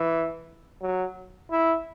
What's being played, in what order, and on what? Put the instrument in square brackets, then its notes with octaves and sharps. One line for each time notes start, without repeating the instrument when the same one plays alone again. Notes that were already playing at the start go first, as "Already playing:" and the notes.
Already playing: [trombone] E3
F#3
E4